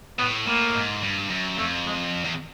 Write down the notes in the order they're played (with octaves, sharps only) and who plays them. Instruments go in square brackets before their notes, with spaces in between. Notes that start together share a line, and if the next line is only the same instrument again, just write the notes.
[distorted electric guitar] A2 [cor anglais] B3
[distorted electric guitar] A2 [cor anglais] A#3
[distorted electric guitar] G#2
G2
F#2
[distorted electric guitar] F2 [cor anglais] A3
[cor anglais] G#3
[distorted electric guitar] E2